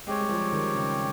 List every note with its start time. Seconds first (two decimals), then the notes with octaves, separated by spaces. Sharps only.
0.07 G#3 C4 G4 C#5
0.21 G3
0.29 F3
0.52 D#3
0.75 C#3